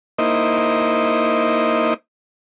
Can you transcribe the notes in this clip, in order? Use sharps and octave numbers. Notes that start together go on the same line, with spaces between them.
A#3 D#4 E4 C5 D#5